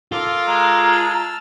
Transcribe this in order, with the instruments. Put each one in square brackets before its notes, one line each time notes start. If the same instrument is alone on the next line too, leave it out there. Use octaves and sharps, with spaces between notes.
[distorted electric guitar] F4 [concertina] A4 A#4 D6
[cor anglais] G#3 [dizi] A#5
[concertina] A5 E6 F6